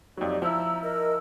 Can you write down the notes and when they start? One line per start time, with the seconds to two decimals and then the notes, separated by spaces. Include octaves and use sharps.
0.17 F2 F#3 D#4 G4 D5
0.42 F3 E4 A#5 E6
0.83 A#4 D#5 E6